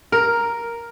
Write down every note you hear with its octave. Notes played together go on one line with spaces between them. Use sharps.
A#4